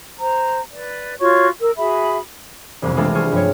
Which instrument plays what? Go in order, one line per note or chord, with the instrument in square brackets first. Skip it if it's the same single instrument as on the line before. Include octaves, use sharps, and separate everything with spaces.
[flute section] C5 A#5
B4 D5
F4 F#4 C#5 C#6
A#4 E6
F#4 G#4 E5 B5
[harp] E1 C2 F2 C3
E3 G#3 A3 D4 F4 A4
G4 G#4 C5 C#6 F6
G2 F3 A3 C5 C#5